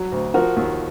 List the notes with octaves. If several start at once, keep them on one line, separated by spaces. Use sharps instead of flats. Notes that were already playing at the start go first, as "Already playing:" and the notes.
Already playing: F#3
D2
F3 F#4 A#4
D#2